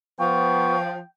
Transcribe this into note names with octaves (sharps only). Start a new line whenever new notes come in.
F3 B3 G5 C#6